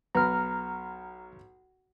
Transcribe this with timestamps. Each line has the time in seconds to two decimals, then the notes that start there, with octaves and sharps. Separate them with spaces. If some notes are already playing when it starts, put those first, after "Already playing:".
0.15 B1 B4 A#5 B5 F6